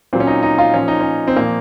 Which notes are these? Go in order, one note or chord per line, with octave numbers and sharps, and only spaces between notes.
A#2 F#3 C4
C#4
D#4
D#4
F4
A#2 F3 C#4
D#4
C#4
C4
A#2 F3 A#3